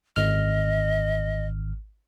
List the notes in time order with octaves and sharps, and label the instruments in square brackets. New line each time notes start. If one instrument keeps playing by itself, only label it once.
[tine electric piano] G#1 F6 [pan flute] D#5